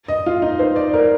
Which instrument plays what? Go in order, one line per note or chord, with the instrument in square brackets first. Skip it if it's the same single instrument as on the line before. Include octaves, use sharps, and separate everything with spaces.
[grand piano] D#5
F4
D#4
C5
D5
A#4